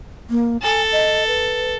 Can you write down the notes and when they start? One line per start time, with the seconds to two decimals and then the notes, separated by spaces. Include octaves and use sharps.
0.30 A#3
0.63 A4 G#5
0.92 D#5
1.27 B4